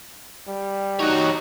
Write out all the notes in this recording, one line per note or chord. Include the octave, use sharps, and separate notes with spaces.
G3
D#4 F#4 G4 C#5